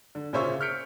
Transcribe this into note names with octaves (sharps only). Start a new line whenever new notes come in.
D3
A#2 C#3 C#4 C5 E5 C#6
F6 G6 B6 C#7 D7